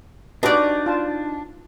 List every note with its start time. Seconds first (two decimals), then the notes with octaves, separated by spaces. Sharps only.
0.43 D4 D#4 F#4 G4 B4 D5
0.86 F4 A5